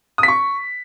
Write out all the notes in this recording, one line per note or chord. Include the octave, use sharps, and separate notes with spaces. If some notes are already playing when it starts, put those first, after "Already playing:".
D#6
B6
C#6